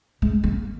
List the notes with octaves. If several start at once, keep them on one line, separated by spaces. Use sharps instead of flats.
G#3
A#3